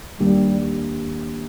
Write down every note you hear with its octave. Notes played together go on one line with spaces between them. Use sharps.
D#2 D#3 G3 A#3 D4 G4